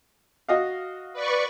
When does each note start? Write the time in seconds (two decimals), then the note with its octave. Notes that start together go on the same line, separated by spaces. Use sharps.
0.49 F#4 D#5 F5
1.13 B4 D5 C#6